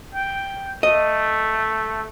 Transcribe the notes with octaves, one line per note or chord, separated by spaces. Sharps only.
G5
A3 D#5